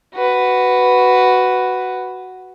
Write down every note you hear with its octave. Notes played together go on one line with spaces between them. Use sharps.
F#4 B4